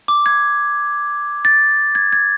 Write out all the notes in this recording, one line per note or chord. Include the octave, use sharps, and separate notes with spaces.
D6
G#6
A6
G#6
G#6